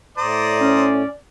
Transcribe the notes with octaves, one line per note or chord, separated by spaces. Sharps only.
A2 C5 D5 A#5 D#6
C#4